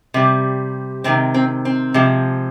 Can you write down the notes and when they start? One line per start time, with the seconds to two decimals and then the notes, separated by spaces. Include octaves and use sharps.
0.14 C3 G3
1.04 C3 D#3 G#3 C4
1.34 C4
1.65 C4
1.94 C3 F3 G#3